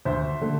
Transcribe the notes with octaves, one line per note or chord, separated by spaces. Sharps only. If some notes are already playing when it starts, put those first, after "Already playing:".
D2 C5 E5
D3 A3